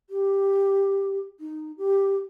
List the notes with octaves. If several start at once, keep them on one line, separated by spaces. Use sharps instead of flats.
G4
D#4
G4